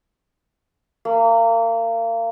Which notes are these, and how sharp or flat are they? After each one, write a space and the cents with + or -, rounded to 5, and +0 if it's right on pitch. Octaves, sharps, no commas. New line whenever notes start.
A#3 -30